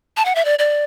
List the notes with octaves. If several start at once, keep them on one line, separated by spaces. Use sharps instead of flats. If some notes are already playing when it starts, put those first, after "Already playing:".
A5
F#5
E5
D5
D5